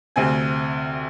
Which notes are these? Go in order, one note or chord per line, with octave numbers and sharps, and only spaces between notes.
D2 C3 C4 G#5